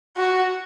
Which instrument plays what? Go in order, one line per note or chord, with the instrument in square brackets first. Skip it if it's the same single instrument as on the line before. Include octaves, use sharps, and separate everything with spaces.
[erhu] F#4